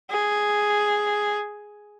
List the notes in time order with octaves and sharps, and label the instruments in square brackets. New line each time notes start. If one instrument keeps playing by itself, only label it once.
[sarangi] G#4